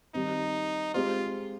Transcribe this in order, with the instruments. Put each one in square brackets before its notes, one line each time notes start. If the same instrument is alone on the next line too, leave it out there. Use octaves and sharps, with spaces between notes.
[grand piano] D#3 G3 C4 [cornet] D#4
[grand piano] G#3 C4 G4 C5 [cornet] F4